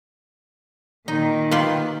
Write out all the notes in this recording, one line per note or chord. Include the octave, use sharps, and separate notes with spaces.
A#2 D#3 D#4
F4 G4 B4